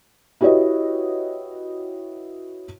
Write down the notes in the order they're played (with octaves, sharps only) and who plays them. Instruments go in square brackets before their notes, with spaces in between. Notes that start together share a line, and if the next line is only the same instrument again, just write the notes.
[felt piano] E4 F#4 G4 B4 C#5 D#5